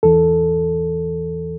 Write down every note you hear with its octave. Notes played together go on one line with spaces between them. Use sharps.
E2 E3 A4